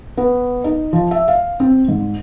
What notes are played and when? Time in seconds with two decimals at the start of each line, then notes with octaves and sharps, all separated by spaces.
0.17 B3
0.64 D#4
0.93 F3
1.11 E5
1.28 F5
1.60 C4
1.88 G#2